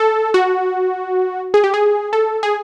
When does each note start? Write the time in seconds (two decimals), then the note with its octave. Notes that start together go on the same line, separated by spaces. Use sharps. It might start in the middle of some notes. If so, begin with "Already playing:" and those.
Already playing: A4
0.34 F#4
1.54 G#4
1.64 G4
1.74 G#4
2.13 A4
2.43 G#4